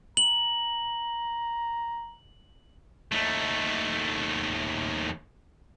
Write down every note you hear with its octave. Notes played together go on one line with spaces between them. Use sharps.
A#5 F#7
D#2 A3